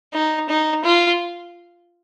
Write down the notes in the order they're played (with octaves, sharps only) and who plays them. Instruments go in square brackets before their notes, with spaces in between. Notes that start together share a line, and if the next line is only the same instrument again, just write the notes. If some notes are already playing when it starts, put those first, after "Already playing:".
[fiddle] D#4
D#4
F4